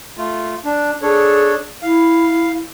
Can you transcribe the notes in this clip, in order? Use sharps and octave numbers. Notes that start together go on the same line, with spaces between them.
A3 F4
D4
D4 G#4 A4 C#5
E4 F5